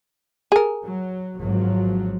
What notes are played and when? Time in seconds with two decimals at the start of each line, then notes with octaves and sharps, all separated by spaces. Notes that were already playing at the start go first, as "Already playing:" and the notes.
0.52 G#4 A#4
0.83 F#3
1.40 G#1 F3 F#3